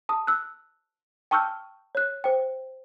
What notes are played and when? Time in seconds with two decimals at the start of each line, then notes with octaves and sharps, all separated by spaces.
0.09 A5 D#6
0.27 E6 F#6
1.31 G5 A5 C#6 E6 F6 G6
1.95 C#5 F#6
2.24 C5 G5